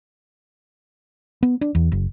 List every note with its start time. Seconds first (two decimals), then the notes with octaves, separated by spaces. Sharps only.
1.43 B3
1.61 D4
1.75 E2
1.92 F#1